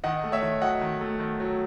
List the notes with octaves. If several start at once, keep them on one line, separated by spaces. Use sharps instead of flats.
D#3 D#5 F#5
A3
C#5 E5
D#3
F#3 D#5 F#5
D#3
A3
D#3
F#3